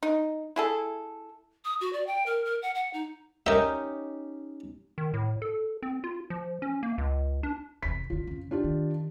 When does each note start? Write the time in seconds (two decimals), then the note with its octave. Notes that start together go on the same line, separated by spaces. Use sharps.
0.03 D#4
0.56 E4 G#4 A4
1.65 D#6
1.81 F#4
1.93 D5
2.07 G5
2.26 A#4
2.45 A#4
2.62 F#5
2.75 F#5
2.94 D#4
3.46 C#4 D#4 G4 A#4 E5
4.98 D#3
5.14 A2
5.42 A4
5.82 C4
6.04 F4
6.30 F3
6.62 C#4
6.83 A#3
6.98 C#2
7.43 D4
7.82 F1 E2 B6
8.10 F#1 D3 F4
8.27 F2 C#3
8.51 D4 F4 G4
8.64 D#3